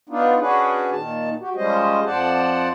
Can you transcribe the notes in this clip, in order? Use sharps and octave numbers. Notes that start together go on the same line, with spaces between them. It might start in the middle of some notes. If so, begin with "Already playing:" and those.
B3 D4 D#4 F4
C#4 D4 F#4 G#4 B4
A#2 D#3 A5
F#4 G4
F3 G3 G#3 C#4 C5 D#5
F2 F3 C5 D5 F#5 A5